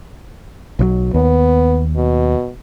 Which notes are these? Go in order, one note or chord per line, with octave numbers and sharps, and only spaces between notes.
B1 E3 F#3
D#2 B3
B2